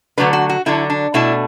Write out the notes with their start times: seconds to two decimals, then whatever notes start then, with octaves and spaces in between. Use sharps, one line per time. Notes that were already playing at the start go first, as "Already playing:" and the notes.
0.17 D3 F#3 A3 D4 B4
0.33 F#4
0.49 F#4
0.66 D3 F#3 D4 E4
0.90 D4
1.14 B2 A3 D4 E4